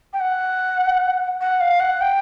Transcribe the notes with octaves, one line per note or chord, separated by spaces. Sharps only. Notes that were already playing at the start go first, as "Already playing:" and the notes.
G5
F#5
F#5
F5
F#5
G5